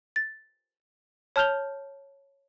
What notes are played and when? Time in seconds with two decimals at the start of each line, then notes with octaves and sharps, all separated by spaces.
0.16 A6
1.36 C#5 A5 F6 G6 F7 G7